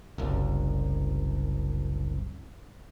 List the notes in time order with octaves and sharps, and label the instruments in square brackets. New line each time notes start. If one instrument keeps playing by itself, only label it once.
[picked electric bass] F#1 C2